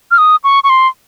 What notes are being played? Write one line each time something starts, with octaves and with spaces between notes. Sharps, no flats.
F6
D#6
C#6
C#6
C6